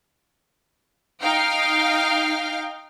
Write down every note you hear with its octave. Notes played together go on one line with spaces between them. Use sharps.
D#4 F5 G5 F6